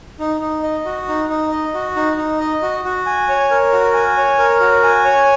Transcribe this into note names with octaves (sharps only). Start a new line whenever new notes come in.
D#4
D#4
D#5
F#4
D#4
D#4
D#5
F#4
D#4
D#4
D#5
F#4
F#4
G#5
C#5
A#4
F#4
G#5
C#5
A#4
F#4
G#5
C#5